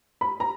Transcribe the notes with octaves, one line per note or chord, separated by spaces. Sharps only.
B5
A#5